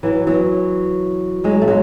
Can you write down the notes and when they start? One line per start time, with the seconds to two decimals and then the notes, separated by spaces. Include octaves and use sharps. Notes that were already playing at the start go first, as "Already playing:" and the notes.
0.03 E3 F#3
0.27 E3 F#3
1.44 F#3 G#3
1.62 A3
1.68 F#3 G#3